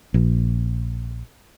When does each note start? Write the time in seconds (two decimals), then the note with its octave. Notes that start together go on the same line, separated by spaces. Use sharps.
0.14 A#1